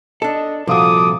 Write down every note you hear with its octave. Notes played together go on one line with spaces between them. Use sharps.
D4 A4 D#5
C2 A#2 F3 F4 F#4 A4 D6 D#6